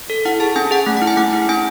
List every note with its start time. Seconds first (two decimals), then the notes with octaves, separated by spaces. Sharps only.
0.10 A4
0.25 E4 F#5
0.40 G#4 A5
0.56 C#4 G#5
0.71 G#4 F#5
0.86 A3
0.97 F#5
1.02 E4
1.07 G#5
1.17 A3 F#5
1.33 E4
1.49 C#4 G#5